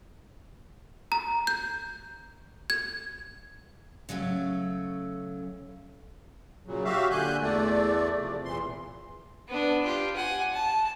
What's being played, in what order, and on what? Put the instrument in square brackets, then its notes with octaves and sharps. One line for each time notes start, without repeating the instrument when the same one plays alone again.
[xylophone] A#5
G6
G#6
[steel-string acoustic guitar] C#3 F#3 A3 C#4
[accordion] A#2 C#3 F#3
F#4 G4 E5 F5
A#2 D3 G#5 F#6 G6
E2 A3 D5
C3 F3
E2 A#2 E3 C6
[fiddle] B3 D4
F4 G4
F#5 G#5
A5